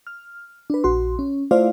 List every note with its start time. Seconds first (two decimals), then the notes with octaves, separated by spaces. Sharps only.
0.07 F6
0.70 D4 B4
0.84 A#1 F#4 C6
1.19 C#4
1.51 A3 E4 F4 C5 D5 F5